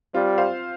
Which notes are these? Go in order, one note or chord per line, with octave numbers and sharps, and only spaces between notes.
G3 C4 F4
C5 F5